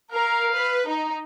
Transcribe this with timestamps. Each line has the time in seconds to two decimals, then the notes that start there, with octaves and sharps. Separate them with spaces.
0.12 A#4 F5
0.54 B4
0.89 D#4